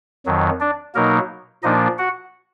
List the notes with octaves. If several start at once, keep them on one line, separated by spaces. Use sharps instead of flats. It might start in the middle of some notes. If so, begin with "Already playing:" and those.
F2 D#3 F#3
D4 D5
B2 F#3 A#3 D#4 A#4
A#2 F3 A#3 D4 D#4 D#5
F#4 F#5